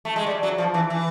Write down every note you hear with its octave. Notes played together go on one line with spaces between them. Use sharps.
A3
G#3
G3
F#3
F3
E3
E3